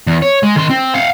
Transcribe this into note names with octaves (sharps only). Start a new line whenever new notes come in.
E2
C#5
G#3
D#3 C6
C4
F5 F#5